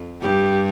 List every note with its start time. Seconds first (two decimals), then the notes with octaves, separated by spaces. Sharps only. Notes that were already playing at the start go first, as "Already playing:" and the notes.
Already playing: F2
0.22 G2 G4